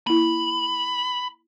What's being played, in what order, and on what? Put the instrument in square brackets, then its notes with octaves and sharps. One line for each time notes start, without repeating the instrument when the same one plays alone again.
[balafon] A#3 E4 [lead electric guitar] B5